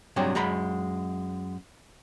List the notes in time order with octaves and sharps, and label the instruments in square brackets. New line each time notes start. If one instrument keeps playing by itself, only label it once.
[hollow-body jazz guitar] G2 C3 F#3 G#4
F#2 G#3 A#5 B5